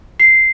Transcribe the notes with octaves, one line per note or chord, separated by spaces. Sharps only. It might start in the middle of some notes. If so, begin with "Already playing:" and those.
C7